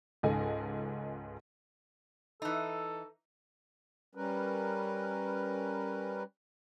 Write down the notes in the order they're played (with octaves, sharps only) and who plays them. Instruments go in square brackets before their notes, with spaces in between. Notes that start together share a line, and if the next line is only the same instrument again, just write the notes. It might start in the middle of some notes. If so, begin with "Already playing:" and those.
[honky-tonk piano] C#2 G#2 A4 D#5 G#5
[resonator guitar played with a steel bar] E3 D#4 [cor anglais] A4
[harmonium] G3 C#4 A#4 B4